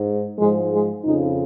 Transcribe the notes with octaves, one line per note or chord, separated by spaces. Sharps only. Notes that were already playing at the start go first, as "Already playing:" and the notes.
Already playing: G#2
G#2 F3 G#3
G#3
F2 C#3 F3 D#4